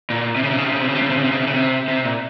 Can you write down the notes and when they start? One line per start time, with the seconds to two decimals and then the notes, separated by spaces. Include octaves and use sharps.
0.10 A#2
0.36 C3
0.43 C#3
0.51 C3
0.58 C#3
0.66 C3
0.73 C#3
0.80 C3
0.88 C#3
0.95 C3
1.02 C#3
1.10 C3
1.17 C#3
1.24 C3
1.32 C#3
1.40 C3
1.47 C#3
1.54 C3
1.88 C3
2.05 A#2